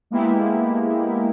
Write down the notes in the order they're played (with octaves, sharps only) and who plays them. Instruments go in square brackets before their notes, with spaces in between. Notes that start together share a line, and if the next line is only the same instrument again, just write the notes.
[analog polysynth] G#3 A#3 B3 E4 G4